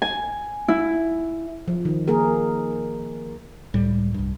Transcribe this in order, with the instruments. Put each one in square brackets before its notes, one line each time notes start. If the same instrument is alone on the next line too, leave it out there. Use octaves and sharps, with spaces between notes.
[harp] G#5
E4
[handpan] F3
D#3
A#3 G#4 A#4
[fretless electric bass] C#2 A2 G3
C2 G2